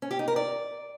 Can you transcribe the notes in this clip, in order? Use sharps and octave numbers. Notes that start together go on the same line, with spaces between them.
C#4
G4
D#4
A#4
D5